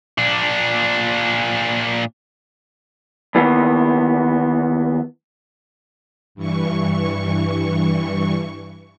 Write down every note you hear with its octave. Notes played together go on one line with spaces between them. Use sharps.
A#2 D4
D#2 E3 B3
G2 E3 C#6